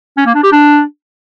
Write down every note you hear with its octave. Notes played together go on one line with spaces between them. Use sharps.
C#4
A#3
D4
G4
D4